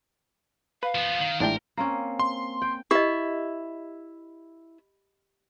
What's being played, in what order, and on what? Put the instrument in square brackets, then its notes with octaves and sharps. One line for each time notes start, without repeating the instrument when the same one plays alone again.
[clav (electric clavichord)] B4 [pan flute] F5
[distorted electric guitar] F3 B3
[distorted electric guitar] D#3 [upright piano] F#7
[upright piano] A1 E5 G7 [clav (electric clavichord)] G#2 D4 G5 [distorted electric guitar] A#4
[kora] A#3 C4 C#4
[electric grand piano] C6
[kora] G5
[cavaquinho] E4 [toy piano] G4 D#5